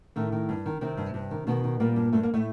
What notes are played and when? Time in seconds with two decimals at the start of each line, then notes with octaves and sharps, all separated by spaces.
0.16 A2 D#3 A3
0.32 D#3
0.49 G2
0.66 D#3
0.81 C3 D#3 C4
0.97 G2
1.14 G2
1.31 D#3
1.47 B2 D#3 B3
1.64 D#3
1.80 A#2 G3 A#3
1.96 G2
2.13 G2 A3
2.23 A#3
2.34 A2 A3